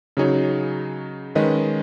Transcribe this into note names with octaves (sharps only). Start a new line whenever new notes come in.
C#3 F#3 D#4 G#4 C#5
D#3 G#3 C#4 B4 D#5